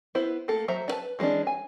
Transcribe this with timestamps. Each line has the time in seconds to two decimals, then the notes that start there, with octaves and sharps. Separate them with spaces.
0.15 B3 E4 C5
0.48 A3 A#3 A4
0.68 F#3 C5 E5 A#5
0.88 D4 B4 A5
1.19 E3 G#3 B3 C#4 D4
1.47 G#5